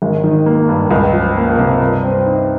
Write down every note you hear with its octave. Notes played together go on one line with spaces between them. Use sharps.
G#1
D#3
A#3
G2
C#2
F3
A#3
C3
G2
C4
D#4